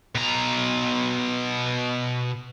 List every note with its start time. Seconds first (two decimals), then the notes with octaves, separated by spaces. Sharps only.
0.15 B2 A#5